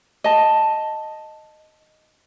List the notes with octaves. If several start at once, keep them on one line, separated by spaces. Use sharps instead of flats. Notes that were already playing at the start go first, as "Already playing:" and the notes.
D#5 A5